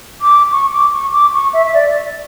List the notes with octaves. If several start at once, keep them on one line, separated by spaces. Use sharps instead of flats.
D6
C#6
D6
C#6
D6
C#6
E5
E5
D5